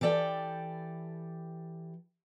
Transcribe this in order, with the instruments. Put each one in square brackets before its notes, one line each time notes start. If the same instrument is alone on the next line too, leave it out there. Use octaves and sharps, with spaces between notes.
[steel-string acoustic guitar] E3 G4 A4 D5 G5